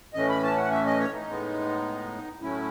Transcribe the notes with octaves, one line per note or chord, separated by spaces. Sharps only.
A2 E3 A3 C#4 D#5
B5
A5
F#5
E5
D#5
C#5
D#4
A2 G#3 B3
A2 F#3 A3 C#4 E4